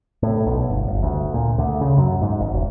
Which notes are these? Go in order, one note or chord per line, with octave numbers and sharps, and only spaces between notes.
A2
B1
G1
G1
D2
A#2
D2
C#3
F#2
G#2
G#1
E1